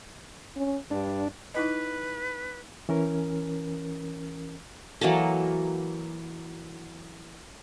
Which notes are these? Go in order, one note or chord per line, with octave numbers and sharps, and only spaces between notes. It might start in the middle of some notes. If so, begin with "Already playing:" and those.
C#4
G2 D4
D#4 E4 B4 D#5
E3 C#4 A#4
E3 F#3 A#3 A4